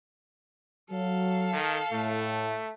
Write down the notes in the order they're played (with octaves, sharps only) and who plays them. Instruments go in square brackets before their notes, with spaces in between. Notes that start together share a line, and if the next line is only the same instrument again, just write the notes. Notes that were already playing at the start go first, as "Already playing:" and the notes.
[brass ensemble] F#3 [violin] A4 F5
[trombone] D#3
[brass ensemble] A2 [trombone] A3